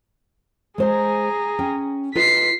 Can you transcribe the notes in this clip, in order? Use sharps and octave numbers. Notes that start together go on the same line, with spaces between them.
G#3 G#4 C5 D#5 A#5
C#4 G5
F4 B4 D#5 B6 C7